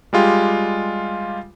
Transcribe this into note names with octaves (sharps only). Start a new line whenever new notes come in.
G3 G#3 F4 G4